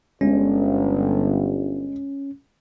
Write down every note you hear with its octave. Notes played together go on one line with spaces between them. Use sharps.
G1 G#3 C#4